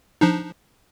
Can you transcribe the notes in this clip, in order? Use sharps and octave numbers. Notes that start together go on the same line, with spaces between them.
F3 D4 D#4